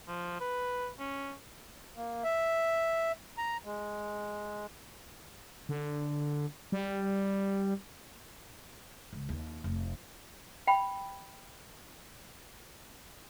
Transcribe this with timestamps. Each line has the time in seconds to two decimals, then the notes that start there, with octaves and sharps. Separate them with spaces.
0.08 F3
0.40 B4
0.99 C#4
1.97 A#3
2.24 E5
3.38 A#5
3.65 G#3
5.69 D3
6.72 G3
9.13 C#2
9.29 D#2
9.64 F1
10.67 G5 B5